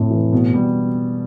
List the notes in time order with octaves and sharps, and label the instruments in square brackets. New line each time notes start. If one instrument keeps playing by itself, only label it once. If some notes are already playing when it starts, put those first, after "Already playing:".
Already playing: [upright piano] F2 C3 A3 [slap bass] A2
[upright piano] E3
B2
G3